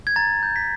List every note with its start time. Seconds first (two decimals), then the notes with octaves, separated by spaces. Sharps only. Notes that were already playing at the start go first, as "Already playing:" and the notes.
0.07 G#6
0.16 A#5 A6
0.43 G6
0.56 B6